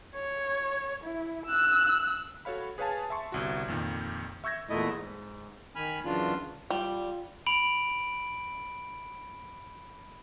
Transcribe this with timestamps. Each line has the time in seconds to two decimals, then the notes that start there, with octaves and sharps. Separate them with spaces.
0.15 C#5
1.04 E4
1.46 E6 F#6
2.45 F#4 A4 C#5 F5 B5
2.78 G#4 B4 C#5 F5 G#5 A5
3.10 E5 A5 C6 C#6
3.32 G1 C2 F#4
3.68 F2 A#2 D#3
4.44 E5 C#6 E6 G6 G#6 A#6
4.70 E2 A#2 A3 E4 D#5
4.94 G#2
5.75 D#3 G#5 B5 F6
6.05 F#2 C#3 E3 D4 F4
6.70 G3 F4
7.46 B5 D7 F#7